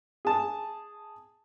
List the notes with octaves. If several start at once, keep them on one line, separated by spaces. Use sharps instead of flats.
G#4 A5